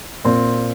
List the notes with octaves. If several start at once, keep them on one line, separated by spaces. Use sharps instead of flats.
A#2 C4